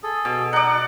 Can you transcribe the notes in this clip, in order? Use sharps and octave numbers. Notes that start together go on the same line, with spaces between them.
G#4 A4
B2
D#4 D5 D#5 F#5